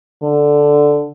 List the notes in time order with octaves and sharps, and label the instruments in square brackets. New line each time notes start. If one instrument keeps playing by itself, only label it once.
[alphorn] D3